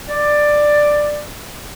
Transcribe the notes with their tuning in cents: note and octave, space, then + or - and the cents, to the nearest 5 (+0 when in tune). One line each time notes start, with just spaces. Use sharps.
D5 +10